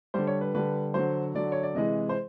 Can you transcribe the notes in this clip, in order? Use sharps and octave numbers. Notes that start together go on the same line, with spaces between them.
D3 G3 C5
C#5
B4
D3 G3 B4
D3 F#3 C5
D3 F#3 D5
C#5
D5
C3 E3 G#3 D#5
C5